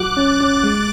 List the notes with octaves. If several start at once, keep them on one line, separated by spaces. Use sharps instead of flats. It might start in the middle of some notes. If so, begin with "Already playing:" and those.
Already playing: F#3 F#4 D6 F#6
C#4 F#6 A6
C#4
G#3